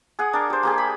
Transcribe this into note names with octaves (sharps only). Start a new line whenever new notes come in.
G#4 F#5 D#6
D4 A#4 D5
G4 C5
A#3 G4 G#4
B5